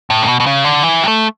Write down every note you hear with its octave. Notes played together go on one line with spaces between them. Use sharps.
A2
C#3
B2
B2
C#3
D3
E3
G3
A3